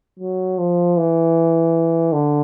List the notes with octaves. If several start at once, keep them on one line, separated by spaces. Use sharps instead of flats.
F#3
F3
E3
D3